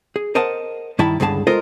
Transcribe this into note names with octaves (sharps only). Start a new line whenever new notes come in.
G#4
A#4 C5 D#5 F#5 A5
G2 D#3 E4 E5 A5 B5
C#2 G2 D3 G#4 A5
G#3 F4 A4 A#4 C5 D#5